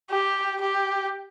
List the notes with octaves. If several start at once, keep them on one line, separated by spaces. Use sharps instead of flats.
G4
G4